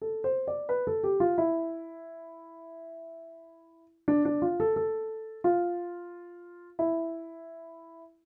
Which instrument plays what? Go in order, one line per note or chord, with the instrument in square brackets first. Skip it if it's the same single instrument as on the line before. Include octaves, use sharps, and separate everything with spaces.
[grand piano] A4
C5
D5
B4
A4
G4
F4
E4
D4
D4
F4
A4
A4
F4
E4